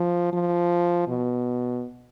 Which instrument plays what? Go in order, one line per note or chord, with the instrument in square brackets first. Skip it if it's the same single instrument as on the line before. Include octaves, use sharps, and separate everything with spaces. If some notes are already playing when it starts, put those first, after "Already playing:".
Already playing: [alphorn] F3
F3
B2